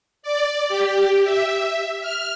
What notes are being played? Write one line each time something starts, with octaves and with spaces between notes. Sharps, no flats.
D5
G4
E5
F6